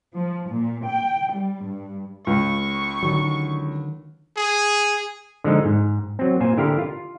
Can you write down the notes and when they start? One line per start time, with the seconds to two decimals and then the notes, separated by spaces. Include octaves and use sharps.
0.15 F3
0.50 A#2
0.85 G5
1.32 G3
1.64 G2
2.27 C#2 C#6
3.03 D3 D#3 F#3
4.37 G#4
5.44 D3 F3 G#3 D#4
5.65 G#2
6.19 F#3 C4
6.40 A#2 F4 C5 G#5
6.58 D3 E4 G4 A#4 F5
6.78 F4